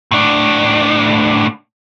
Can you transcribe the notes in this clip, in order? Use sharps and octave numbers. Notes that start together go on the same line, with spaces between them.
A2 D4